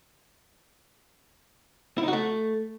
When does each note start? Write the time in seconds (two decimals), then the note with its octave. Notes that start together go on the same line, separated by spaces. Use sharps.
1.98 E4
2.03 D#4
2.08 F#4
2.13 A3